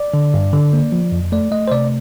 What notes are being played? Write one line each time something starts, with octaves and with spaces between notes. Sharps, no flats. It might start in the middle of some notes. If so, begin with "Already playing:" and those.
Already playing: D5
D3
G2
D3
A#3
F3
F2
A3 D5
A3 D#5
C5
C3 D5